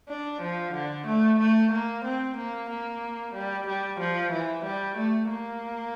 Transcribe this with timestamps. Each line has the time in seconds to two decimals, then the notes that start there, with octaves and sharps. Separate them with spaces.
0.09 D4
0.41 F3
0.74 D3
1.07 A3
1.39 A3
1.71 A#3
2.05 C4
2.37 A#3
2.69 A#3
3.34 G3
3.67 G3
4.00 F3
4.32 E3
4.65 G3
4.97 A3
5.30 A#3